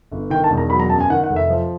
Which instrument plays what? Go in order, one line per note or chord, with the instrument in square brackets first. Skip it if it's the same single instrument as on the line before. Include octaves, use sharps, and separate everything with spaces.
[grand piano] G1
D#3 G5
A5
E1
A#5
F#3 B5
A#5
F#2 A5
G#5
D#3 F#5
F#5
F1
E5
F3